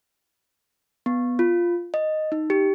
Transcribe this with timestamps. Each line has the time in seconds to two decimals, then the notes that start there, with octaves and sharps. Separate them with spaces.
1.06 B3
1.39 F4
1.94 D#5
2.32 D#4
2.50 G4